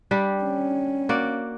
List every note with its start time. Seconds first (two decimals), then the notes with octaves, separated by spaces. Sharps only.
0.11 G3 D4 G4
0.44 C#4
1.09 A#3 F#4 D5